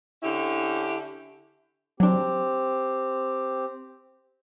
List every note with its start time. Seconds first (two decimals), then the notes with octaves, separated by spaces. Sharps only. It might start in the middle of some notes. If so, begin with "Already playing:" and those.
0.22 D3 C#4 E4 G4
2.00 F#3 C4 D4 G4